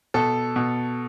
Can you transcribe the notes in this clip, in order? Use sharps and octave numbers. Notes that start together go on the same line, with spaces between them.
B2 A4
B2